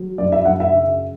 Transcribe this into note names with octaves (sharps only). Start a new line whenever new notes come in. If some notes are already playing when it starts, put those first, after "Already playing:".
Already playing: F#3
F#2 D5
E5
F#2 F#5
E5
C#3